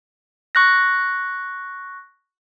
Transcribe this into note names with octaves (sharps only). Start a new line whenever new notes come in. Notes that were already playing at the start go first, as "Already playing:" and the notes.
C#6 F#6 A#6